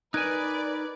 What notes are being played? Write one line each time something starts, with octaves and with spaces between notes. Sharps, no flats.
D#4 A#4 B4 D5 G#5 F#6 G#6